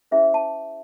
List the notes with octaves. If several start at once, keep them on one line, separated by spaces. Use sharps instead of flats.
C#4 E4 G#4 C5 E5
A5